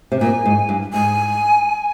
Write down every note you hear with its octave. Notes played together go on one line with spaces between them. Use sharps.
C3
A#2 G#5
G#2
G2
G#2 G#5